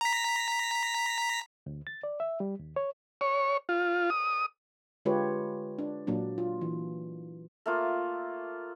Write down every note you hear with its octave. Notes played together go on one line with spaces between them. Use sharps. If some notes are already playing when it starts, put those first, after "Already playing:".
A#5 B6
D2
A6
D5
E5
G3
D#2
C#5
C#5
F4
D#6
D3 G#3 F4 G4 B4 C#5
D4
A#2 F#3 A#3 D4
F4
E3
A3 A#3 F4